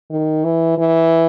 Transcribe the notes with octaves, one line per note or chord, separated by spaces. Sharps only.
D#3
E3
E3